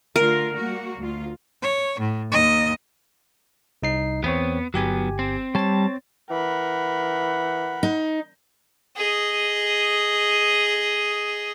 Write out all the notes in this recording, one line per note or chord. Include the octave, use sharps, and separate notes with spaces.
D3 A3 F4 A#4
G3 A#3 F#4
D2 F4
C#5
A2
D#2 D#5
C2 D#4 C7
E2 B3 C4 C#5
G1 F#3 B3 G4 G#5
C4
G3 C#5 A5 A6
E3 A#4 F#5 B5
D#4
G#4 D#5